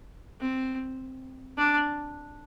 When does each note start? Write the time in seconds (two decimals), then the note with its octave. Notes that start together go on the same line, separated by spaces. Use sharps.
0.40 C4
1.58 D4